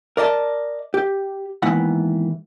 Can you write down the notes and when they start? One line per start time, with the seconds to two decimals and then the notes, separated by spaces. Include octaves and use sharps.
0.17 A#4 D5 D#5 A5
0.94 G4
1.62 D#2 G#2 E3 B3 F#5